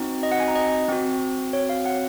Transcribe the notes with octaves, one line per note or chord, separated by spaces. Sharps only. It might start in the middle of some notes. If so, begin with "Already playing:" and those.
Already playing: C4 D#4 F#4
D#5
F#5
G#5
A#5
D#5
C4 F#4
C#5
F5
F#5